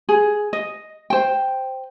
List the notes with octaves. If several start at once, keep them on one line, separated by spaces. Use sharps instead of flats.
G#4
D#5
C5 G5